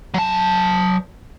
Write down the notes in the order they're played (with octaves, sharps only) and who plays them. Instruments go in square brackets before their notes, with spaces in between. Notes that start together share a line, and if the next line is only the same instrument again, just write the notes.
[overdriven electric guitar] F#3 A5